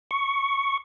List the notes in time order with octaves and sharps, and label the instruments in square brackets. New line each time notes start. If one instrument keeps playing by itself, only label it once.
[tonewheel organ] C#6